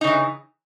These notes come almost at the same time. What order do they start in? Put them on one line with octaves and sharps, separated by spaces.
D#4 C#3 E3